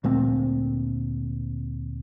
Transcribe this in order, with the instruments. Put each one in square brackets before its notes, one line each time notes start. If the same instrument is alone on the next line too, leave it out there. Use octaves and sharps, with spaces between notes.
[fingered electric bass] D2 A#2 A3 C4